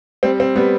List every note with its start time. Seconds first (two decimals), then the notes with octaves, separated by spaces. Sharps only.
0.23 G3 C4
0.40 C4
0.56 G3 B3